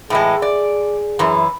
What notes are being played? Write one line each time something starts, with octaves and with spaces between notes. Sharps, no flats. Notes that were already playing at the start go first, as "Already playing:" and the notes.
A2 E3 G#3 G#4
D5
F#2 E3